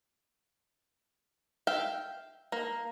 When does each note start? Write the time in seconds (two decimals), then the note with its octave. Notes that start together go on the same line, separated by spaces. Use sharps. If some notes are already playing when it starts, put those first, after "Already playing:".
1.67 E5 F5 G5
2.52 A#3